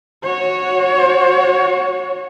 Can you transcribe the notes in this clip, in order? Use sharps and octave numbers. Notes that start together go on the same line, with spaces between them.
F#4 C#5